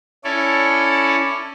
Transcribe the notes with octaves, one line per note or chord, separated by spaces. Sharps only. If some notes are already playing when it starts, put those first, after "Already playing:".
C#4 E4 A4 C#5 D5